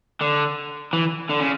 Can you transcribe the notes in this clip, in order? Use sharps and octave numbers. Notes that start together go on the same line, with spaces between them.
D3
E3
D3
C#3